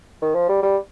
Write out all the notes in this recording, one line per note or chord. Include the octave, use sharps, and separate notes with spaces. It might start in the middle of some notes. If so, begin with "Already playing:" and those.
D#3
F3
G3
G3